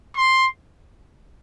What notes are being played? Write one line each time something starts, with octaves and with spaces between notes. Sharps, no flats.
C6